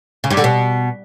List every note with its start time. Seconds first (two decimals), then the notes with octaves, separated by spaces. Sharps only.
0.24 C#3
0.30 G2
0.37 D3
0.44 B2